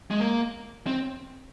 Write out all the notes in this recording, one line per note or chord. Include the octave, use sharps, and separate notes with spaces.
G#3
A#3
C4